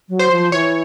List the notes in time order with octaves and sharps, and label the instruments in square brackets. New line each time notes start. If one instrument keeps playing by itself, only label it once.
[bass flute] F#3
[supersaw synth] C5
[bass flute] F3
[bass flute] E3 [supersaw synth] C#5